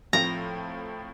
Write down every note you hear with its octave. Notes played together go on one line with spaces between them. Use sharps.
A2 F3 C4 A#5